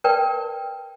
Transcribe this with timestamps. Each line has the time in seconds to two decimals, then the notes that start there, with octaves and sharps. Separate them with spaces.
0.04 A#4 B4 D5 G5 A5